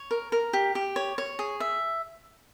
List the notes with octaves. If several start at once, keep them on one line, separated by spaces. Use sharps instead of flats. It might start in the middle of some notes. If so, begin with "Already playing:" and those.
Already playing: C#5
A#4
A#4
G4
G4
C#5
C#5
G#4
E5